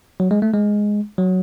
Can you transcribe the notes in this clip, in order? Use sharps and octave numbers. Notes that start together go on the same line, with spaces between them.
F#3
G#3
A3
G#3
F#3